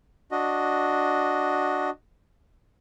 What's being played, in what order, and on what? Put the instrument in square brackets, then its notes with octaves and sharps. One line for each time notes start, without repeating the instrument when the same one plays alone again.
[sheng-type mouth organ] D4 F#4 D#5